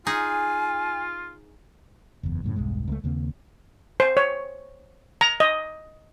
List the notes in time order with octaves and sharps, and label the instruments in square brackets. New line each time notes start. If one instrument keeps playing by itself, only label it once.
[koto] D#4 G#4 [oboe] F4 [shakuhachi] G#5
[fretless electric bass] F#1 E2
F#2 A2 C#3
E1 B1 G2 G#3
C#2 G#3 A3
D#2 C#3 A#3 C4
[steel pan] C5
C#5
A#5
D#5